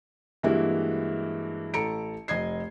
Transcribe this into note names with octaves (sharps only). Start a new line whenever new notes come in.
G2 E3 G#3 A#3 E4 F#4
A1 A4 A#5 C#7 D7
F1 D#5 G#6 C7